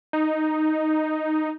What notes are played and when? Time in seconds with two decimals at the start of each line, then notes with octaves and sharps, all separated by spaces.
0.13 D#4